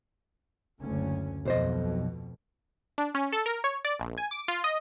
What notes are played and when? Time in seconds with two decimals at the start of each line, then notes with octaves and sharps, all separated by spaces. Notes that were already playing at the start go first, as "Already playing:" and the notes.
0.80 F#1 D2 C#4
1.45 B1 F2 B2 C5 D#5
2.98 D4
3.15 C#4
3.32 A4
3.46 A#4
3.64 C#5
3.85 D5
4.00 A#1
4.18 G#5
4.31 D6
4.48 F4
4.64 D#5